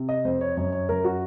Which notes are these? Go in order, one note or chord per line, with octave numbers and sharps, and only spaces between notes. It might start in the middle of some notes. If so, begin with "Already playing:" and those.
Already playing: C3
D#5
F2 C5
C#5
F#2 C#5
C#5
F#2 A#4
F#4